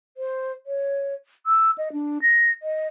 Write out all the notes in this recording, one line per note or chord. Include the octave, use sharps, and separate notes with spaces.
C5
C#5
E6
D#5
D4
A#6
D#5